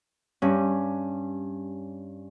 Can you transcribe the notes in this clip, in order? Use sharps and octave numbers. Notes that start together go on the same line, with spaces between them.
G2 C#4